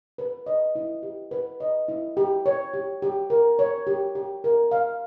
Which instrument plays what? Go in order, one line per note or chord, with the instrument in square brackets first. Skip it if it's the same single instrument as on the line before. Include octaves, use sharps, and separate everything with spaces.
[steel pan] B4
D#5
E4
G4
B4
D#5
E4
G4
C#5
G4
G4
A#4
C#5
G4
G4
A#4
F5